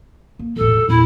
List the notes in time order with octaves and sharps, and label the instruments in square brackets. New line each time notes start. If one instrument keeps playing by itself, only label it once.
[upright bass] A#3
[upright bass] E1 A1 [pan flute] A4
[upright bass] E2 A#2 [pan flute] E4